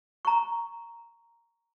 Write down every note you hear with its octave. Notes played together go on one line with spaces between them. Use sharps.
A#5 C#6